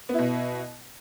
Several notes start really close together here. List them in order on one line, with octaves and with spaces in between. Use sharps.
B3 E4 B2